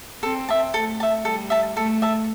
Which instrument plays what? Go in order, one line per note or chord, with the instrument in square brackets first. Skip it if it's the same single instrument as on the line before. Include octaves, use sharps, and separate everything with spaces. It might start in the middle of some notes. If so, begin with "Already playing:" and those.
[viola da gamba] C4 [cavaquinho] A4
[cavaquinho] E5 A5
[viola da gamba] A3 [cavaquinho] A4
[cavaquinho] E5 A5
[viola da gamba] G3 [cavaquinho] A4
[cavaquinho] E5 A5
[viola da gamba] A3 [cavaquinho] A4
[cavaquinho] E5 A5